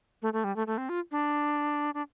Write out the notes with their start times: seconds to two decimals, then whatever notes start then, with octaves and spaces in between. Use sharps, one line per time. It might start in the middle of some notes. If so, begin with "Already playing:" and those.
0.22 A3
0.33 A3
0.44 G3
0.56 A3
0.67 A3
0.78 C4
0.89 F4
1.12 D4
1.94 D4